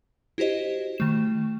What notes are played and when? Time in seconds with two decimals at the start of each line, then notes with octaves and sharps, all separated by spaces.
0.38 E4 F#4 G4 C5 D#5
0.98 D#3 A3 E7